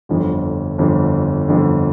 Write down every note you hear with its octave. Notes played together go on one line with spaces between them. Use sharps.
G1 F2 D3
G1 F2 D3
G1 F2 D3